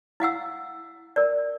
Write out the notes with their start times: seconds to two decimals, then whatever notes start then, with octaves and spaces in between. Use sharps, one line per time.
0.20 E4 F5 F#5 E6
1.16 A#4 D5